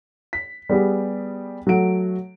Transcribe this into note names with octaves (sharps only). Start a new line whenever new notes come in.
B6
G3 B3 G4 G#4
F#3 A3 F#4 D7